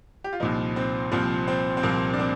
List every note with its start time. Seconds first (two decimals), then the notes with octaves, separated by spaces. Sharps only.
0.24 G4
0.33 F4
0.40 C2 A#2 F3 D#4
0.76 C4
1.12 C2 A#2 F3 C4
1.48 C4
1.77 C4
1.83 C2 A#2 F3 A#3
2.13 D4
2.19 C4